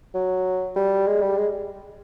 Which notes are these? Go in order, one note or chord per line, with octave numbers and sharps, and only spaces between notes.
F#3
G3
G#3
G3
G#3